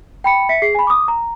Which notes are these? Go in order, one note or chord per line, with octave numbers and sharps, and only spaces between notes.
G5 B5 C#7
E5 B6 C#7
G#4 C7
G#5 B5
D6 D#6
A#5